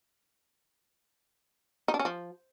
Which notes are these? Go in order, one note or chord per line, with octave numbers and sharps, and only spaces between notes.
D#4
D4
C#4
F3